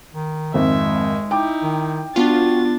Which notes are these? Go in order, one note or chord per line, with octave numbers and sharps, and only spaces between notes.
D#3
G#1 F2 G#3 E5
D#4 E4 G5 D6 G6
D#3
B3 D4 F4 F#4 A6